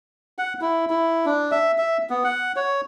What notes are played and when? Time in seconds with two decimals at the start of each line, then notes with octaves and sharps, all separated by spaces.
0.38 F#5
0.61 E4
0.90 E4
1.26 D4
1.52 E5
1.78 E5
2.10 B3
2.24 F#5
2.56 C#5